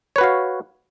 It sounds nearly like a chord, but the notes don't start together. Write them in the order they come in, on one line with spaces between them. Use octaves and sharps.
C#5 B4 F#4 F5